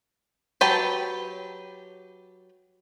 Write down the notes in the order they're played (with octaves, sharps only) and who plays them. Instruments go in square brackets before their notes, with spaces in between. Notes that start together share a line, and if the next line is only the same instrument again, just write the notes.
[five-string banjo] F#3 G4 B4 G5 A5